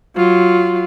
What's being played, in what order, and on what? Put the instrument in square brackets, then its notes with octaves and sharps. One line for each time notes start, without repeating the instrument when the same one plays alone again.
[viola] F#3 F4